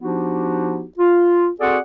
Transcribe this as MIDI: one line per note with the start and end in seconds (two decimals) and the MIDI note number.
0.01 0.85 53
0.01 0.85 59
0.01 0.85 62
0.01 0.85 63
0.01 0.85 66
0.01 0.85 67
0.98 1.49 65
1.60 1.78 60
1.60 1.78 66
1.60 1.78 68
1.60 1.78 69
1.60 1.78 74
1.60 1.78 78